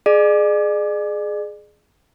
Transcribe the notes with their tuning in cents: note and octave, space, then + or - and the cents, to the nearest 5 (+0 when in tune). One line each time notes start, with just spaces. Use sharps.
G#4 +15 D5 +40